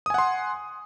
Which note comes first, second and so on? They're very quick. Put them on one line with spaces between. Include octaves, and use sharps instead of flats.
D#6 G#5 F#5 C6